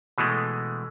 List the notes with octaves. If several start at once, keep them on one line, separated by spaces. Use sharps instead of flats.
B2 E3 G#3 A3